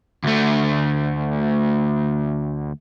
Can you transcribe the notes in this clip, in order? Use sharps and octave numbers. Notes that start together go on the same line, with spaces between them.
D2 A3